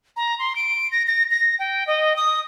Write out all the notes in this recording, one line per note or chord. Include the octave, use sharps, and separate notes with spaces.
A#5
C6
D7
A#6
A#6
A#6
G5
D#5
D#6